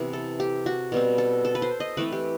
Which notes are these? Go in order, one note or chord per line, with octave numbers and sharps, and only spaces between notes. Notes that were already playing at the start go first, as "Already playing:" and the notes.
Already playing: C3 E3 B3
A4
G4
F#4
B2 G3 C4
A4
A4
B4
C5
D#5
E3 A3 C4 B4
G4